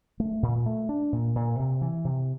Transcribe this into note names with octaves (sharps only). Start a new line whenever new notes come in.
A3
A#2
A3
D4
A#2
A#2
C3
E3
C3